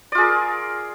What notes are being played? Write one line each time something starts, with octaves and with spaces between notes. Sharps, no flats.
F4 G#4 A#4 D5